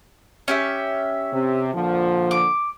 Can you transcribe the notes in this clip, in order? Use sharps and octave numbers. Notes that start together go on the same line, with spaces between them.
C#4 G4 E5
C3
A#2 D3 F3
D6